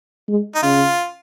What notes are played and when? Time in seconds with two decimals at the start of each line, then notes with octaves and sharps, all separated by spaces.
0.28 G#3
0.55 D#4
0.62 C#3 F4